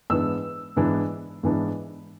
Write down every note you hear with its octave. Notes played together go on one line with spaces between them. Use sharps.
G#2 E3 B3 D4 E6
G#2 E3 B3 D4
G#2 E3 B3 D4